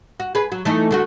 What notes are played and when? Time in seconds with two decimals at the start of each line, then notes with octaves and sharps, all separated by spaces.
0.20 F#4
0.35 G#4 B4
0.52 F#3
0.65 E3 A3 D#4
0.91 D3 A3 F#4